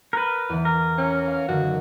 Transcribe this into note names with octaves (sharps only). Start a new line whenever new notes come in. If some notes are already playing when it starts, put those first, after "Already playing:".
A#4 B4
E2 E3
A#4
C#4
F5 F6
F#2 D3 D#3 F#4